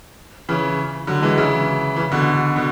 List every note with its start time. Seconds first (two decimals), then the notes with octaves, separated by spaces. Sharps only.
0.49 C#3 E3
1.07 D3 F#3
1.22 E3 G#3
1.37 C#3 E3
1.96 C#3 E3
2.12 B2 D3
2.56 B2 D3